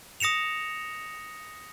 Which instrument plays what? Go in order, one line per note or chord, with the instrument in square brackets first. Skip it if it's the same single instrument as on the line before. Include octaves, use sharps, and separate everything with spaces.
[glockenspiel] D#6 A#6 C#7 E7 F7